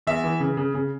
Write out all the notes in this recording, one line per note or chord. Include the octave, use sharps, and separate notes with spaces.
E2 E5
E3
C#3
C#3
C#3